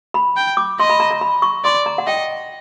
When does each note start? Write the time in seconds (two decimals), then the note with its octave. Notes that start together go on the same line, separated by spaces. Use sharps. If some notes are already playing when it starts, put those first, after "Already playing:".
0.14 B5
0.37 G5
0.57 D6
0.80 D#5 C6
0.90 B5
1.00 A#5
1.11 A#5
1.21 B5
1.42 C#6
1.65 D5 C6
1.86 A#5
1.98 F#5
2.07 D#5 G5